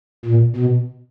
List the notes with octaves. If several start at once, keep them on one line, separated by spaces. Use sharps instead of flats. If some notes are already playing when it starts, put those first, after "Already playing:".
A#2
B2